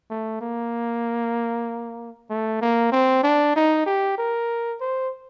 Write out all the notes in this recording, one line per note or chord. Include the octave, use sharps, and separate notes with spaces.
A3
A#3
A3
A#3
C4
D4
D#4
G4
A#4
C5